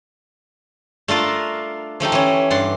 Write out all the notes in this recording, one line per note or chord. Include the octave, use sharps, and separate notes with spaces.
A3 D4 F4 A#4
F3 A3 D#4 G4
E3 C#4
G2 D5 F#5 C6